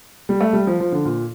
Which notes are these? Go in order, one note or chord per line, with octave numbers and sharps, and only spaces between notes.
G3
A3
G3
F3
F3
D3
A#2